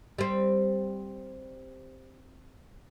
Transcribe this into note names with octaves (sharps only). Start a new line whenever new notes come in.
G3 C4